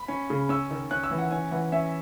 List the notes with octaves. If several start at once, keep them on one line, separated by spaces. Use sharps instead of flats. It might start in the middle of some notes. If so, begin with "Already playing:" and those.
Already playing: B5
C#4
C#3
C#4 E6
D#3
C#4 F#6
E6
E3
F#5
C#4 G#5
E3 F#5
C#4 E5